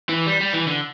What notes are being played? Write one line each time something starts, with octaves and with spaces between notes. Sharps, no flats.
E3
G3
G3
E3
D3